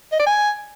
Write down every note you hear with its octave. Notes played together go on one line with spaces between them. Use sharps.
D#5
D5
G#5